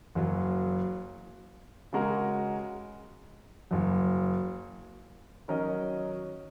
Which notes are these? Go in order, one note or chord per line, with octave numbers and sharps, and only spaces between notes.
F#1 F#2 F#3
C#3 G#3 F#4 A#4
F#1 F#2 F#3
D#3 F#3 C#4 A#4 D#5